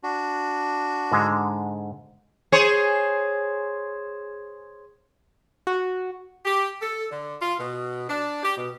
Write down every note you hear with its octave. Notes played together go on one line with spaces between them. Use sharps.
D4 F#4
G#2 D3 G#3
G#4 C5 C#5
F#4
G4
A4
D3
F4
B2
D4
G4
B2